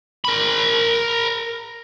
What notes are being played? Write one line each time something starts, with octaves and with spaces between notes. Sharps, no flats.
A#4 B5